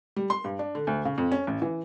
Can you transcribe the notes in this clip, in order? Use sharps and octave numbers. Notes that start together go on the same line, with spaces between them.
G3
C6
G2
D4
D3
D2
C#3
F2
C#4
A1
E3